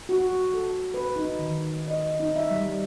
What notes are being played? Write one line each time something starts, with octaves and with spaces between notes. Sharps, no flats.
F#4
A4
B4
D#4
D#3
D#5
D#4
E5
G3